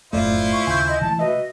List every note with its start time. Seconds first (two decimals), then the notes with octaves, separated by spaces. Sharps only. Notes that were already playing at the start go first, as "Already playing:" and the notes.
0.13 F1 F#2 A2 A3 E4 F4 C5 D5
0.52 C#6
0.67 D#2 C#3 G#5 G6
0.88 D#5
1.01 C3 E3 G#3 A3 A5
1.19 F#4 B4 D#5 E5